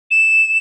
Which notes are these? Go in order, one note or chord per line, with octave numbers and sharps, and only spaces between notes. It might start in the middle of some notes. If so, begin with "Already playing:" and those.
E7